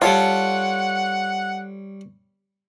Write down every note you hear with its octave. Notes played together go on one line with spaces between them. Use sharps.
G3 F4 A4 C#5 F#5